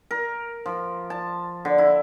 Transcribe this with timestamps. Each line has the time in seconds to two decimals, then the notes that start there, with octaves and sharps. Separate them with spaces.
0.11 A#4
0.66 F3
1.10 A5
1.65 D3
1.78 E4